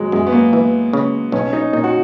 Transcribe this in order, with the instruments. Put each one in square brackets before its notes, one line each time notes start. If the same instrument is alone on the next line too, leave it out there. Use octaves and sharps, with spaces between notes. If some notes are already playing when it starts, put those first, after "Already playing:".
Already playing: [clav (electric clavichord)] G#1 [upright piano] F#3 G#3
[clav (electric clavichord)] F#2 [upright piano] G#3
[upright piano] B3
A#3
[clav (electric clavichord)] E3
C#3
[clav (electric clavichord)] B1 [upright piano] C#4
[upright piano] D#4
[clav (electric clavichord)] A#2 [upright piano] D#4
[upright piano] F#4